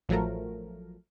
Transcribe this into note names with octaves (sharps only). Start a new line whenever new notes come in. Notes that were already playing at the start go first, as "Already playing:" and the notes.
A1 F3 F#3 A3 A#4